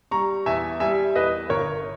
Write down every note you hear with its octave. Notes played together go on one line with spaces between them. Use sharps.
G3 A#5 C#6
E2 E5 G#5
G3 E5 G#5
E2 B4 D#5
G1 A#4 C#5